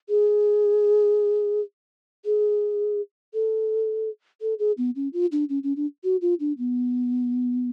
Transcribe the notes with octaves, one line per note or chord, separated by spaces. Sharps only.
G#4
G#4
A4
A4
G#4
B3
C#4
F4
D4
C#4
C#4
D4
F#4
F4
D4
B3